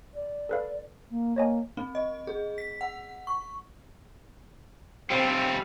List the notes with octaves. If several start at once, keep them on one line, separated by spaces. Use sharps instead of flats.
D5
A4 B4 F5
A#3
A#3 C#5 D#5 G#5
C4
D#5
G#4
B6
F#5
C#6
G3 C4 F4